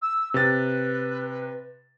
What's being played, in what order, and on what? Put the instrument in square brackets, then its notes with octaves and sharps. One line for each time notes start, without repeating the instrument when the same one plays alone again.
[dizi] E6
[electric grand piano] C3 A6 [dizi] B4